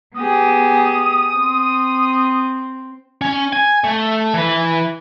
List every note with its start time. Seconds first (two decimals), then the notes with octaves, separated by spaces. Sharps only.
0.17 B3 G4 G#4 D#6
1.36 C4
3.22 C#4
3.53 G#5
3.84 A3
4.34 E3 B4